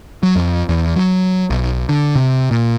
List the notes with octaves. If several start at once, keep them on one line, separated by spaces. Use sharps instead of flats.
F#3
F2
E2
F#3
B1
D3
C3
A#2